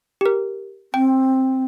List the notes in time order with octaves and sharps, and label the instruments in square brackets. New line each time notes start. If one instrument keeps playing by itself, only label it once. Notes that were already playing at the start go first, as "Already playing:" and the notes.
[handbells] G4 A#4
[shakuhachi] C4 [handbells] G5